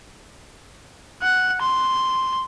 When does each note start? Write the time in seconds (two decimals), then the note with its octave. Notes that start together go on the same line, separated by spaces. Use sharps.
1.22 F#5
1.62 C6